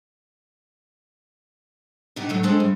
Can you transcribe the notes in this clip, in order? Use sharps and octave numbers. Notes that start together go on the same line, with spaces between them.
B2 D4 D#4 G4
A2 F#3 A3
G#3 D4 G#4 A4 C5 G5
G2